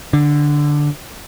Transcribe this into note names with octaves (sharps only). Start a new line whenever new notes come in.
D3